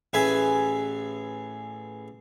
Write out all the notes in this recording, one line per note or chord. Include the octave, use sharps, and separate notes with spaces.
A1 G#4 B4 E5 G#5